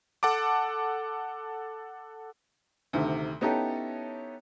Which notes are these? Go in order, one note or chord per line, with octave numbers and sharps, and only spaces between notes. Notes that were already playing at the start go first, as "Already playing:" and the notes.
A4 F#5 A5 D6
D2 C3 D#3
B3 C#4 D#4 E4 G4 A4